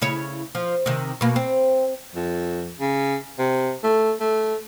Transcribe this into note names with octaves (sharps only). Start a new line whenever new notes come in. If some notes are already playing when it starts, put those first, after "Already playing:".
C#3 E4 C#5
F3
C3 D#3
B2 A#3
C4
F2
C#3
C3
A3
A3